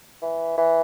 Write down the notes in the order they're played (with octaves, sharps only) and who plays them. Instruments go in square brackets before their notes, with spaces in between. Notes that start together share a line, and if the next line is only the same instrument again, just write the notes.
[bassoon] E3
E3